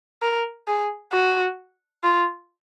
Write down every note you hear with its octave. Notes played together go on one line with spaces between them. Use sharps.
A#4
G#4
F#4
F4